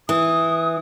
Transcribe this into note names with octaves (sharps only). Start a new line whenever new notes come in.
E3 D#6